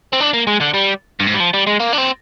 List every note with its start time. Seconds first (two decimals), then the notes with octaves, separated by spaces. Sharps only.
0.13 C4
0.20 D4
0.34 A#3
0.47 G#3
0.61 D3
0.74 G3
1.20 G2
1.27 G#2
1.34 G3
1.40 F3
1.53 G3
1.67 G#3
1.80 A#3
1.93 D4
1.98 C4